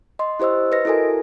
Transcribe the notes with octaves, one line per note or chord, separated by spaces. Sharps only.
D#5 C6
E4 G4 C5 D#5 E6
B4 D#5 A#6
E4 F#4 A4 A#4 G#5